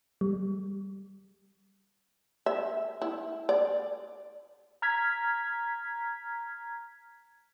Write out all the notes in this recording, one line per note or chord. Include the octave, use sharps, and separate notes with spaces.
G3
E5
E4
D5
A#5 F6 G#6 B6